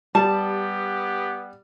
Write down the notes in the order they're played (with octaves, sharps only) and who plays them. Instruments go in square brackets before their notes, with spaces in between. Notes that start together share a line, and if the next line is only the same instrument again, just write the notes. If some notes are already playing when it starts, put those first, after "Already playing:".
[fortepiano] G3 [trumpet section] B3 G4 [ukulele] A5